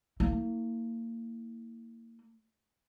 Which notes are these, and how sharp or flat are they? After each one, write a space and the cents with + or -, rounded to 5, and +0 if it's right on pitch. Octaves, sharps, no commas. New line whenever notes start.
A#3 -25 E4 -25